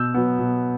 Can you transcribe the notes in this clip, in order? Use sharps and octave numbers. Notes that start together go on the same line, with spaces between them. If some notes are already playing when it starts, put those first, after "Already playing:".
Already playing: B2 E6 G6
F#3 B3
B2